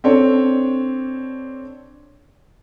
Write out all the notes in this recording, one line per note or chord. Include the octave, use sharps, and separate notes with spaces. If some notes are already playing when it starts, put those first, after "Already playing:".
C4 D4 A4 C#5